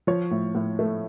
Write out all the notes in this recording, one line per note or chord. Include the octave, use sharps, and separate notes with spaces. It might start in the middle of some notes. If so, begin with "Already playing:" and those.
F3 C#5
A2
A2
A3